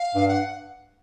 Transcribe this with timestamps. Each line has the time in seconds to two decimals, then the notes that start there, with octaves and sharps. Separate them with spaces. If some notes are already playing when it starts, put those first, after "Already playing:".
Already playing: F5
0.15 G2
0.28 F#5